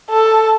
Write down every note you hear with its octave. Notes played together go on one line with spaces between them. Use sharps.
A4